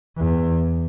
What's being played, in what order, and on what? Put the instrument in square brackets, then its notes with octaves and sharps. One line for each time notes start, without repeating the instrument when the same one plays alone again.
[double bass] E2